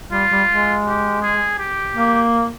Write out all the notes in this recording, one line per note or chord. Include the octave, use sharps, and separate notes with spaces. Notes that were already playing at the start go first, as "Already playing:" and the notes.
G3 F4
G3
G#3
G4
G#4
G4
A#3